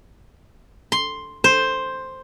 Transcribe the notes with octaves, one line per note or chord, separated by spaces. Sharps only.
C6
C5